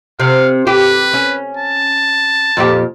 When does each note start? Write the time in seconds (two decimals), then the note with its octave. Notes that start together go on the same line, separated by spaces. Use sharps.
0.20 C3 F5
0.67 G4 B4
1.13 C#4
1.57 A5
2.57 F2 A#2 G4